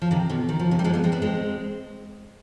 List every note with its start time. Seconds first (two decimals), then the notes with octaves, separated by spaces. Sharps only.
0.02 F3
0.11 C3 D#3
0.29 B2 D3
0.49 D#3
0.59 F3
0.71 C3 D#3
0.79 G3
0.84 F3 G#3
0.94 G3 B3
1.04 G#3 C4
1.12 B3 D4
1.22 G#3 C4